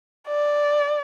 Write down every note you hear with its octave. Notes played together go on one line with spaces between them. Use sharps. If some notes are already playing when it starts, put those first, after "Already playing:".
D5